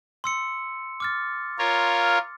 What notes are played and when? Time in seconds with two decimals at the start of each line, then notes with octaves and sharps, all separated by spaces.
0.24 C6 E6 C#7
1.00 D6 F6 A6
1.59 F4 A#4 C#5